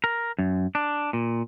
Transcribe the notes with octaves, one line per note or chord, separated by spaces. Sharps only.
A#4
F#2
D4
A#2